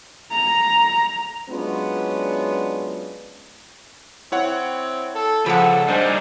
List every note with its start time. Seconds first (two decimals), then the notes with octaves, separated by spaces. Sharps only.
0.31 A#5
1.50 F#3 G#3 B3 C#4 D4 F4
4.32 C4 E4 C#5 F#5
5.15 A4
5.46 C#2 F3 A4 F#5 A#5 B5
5.88 G3 G#3 D4 D#4 C5 G#5